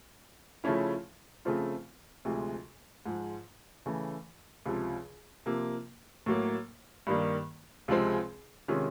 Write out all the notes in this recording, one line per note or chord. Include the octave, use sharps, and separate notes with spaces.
C#3 F3 A3 C#4 E4
C#3 F3 A3 C4 F4
D2 C3 F3 G#3
G#2 F3 G#3
C#3 E3 A3
C#2 C3 F3
C3 F3 A#3
A2 F#3 A#3
G2 D#3 G3 A#3
C#2 C3 F3 G#3 C4
C3 D#3 G#3 C#4 F4